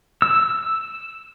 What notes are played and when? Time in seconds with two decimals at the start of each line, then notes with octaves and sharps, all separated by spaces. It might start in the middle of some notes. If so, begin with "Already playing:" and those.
0.22 E6